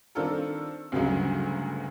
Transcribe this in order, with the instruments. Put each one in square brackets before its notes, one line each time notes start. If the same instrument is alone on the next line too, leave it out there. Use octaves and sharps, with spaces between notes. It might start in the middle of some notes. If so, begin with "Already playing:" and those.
[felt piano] D#3 C4 D4 F4 A4 A#4
D2 G2 C#3 F#3 G#3